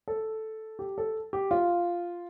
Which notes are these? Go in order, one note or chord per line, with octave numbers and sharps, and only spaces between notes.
A4
G4
A4
G4
F4